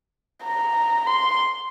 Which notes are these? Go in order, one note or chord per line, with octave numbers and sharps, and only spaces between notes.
A#5
C6